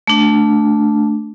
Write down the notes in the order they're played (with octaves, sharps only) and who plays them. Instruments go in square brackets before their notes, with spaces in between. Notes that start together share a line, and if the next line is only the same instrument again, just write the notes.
[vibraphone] A3 D4